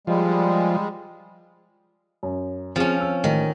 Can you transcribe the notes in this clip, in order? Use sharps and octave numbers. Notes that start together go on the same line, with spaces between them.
F3 G3 G#3
F#2
F3 C4 C#4 G#4 F5
C4 E6
A1 D#3